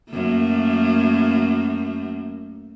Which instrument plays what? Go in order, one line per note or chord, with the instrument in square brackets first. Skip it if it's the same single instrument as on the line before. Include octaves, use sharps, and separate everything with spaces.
[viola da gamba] F#2 A3 A#3